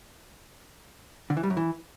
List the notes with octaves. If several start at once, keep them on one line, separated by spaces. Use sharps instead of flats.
D3
E3
G3
F#2
E3